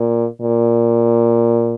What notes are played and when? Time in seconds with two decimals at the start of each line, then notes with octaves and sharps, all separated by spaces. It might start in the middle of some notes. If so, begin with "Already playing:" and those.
Already playing: A#2
0.41 A#2